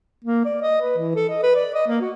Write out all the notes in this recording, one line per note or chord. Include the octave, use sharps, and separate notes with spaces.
A#3
D5
D#5
B4
E3
A4
D#5
B4
D5
D#5
A#3
F#4